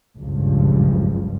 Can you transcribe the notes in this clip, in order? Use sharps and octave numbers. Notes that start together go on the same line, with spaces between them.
F#1 C#2 G2 A#2 F3